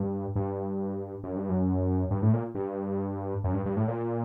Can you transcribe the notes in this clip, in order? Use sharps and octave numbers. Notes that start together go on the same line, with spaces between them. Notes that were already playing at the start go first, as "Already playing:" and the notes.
Already playing: G2
G2
F#2
G2
F#2
G2
A2
A#2
G2
F#2
G2
G2
A2
A#2